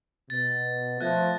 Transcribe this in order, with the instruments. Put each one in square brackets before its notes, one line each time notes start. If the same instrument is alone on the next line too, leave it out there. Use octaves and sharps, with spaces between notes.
[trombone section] B2 [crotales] A6
[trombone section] F3 A3 [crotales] F#6 G#6 A#6